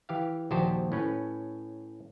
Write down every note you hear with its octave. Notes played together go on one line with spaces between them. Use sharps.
E3 G4 F5
A#1 D#2 F#4 G4 C5 A5
A2 C#4 B4